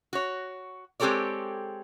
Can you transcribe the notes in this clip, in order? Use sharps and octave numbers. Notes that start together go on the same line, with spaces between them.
F#4 C#5
G#3 C4 G4 A4 C#5 D5